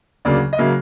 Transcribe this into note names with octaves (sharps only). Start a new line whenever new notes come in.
D2 C#3 F#3 A#3 D5
D#5
C#3 F#3 A#3 E5